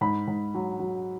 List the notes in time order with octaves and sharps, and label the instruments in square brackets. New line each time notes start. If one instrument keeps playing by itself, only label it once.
[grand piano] G#2 B5
G#2
F#3
F#3